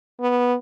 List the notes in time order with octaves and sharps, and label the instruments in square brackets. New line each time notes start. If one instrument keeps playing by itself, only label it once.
[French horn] B3